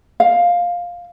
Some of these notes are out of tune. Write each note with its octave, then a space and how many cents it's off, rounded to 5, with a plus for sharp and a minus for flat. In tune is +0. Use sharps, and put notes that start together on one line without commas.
F5 +5